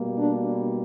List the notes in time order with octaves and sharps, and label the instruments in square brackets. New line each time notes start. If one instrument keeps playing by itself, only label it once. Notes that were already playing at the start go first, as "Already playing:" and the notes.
Already playing: [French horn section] B2 G3 A#3
D4